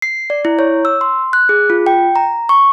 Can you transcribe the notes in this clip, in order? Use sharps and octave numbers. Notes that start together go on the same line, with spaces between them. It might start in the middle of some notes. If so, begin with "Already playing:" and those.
C7
D5
E4
C#5
E6
C6
F#6
G#4
F4
G5
A#5
C#6